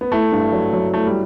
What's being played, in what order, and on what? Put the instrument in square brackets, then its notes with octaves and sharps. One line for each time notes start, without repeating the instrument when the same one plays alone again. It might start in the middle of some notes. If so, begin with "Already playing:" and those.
[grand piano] B3
[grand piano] A3 [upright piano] E4
[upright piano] G2
F#3
F#3
[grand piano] A3 [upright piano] E4
[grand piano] G3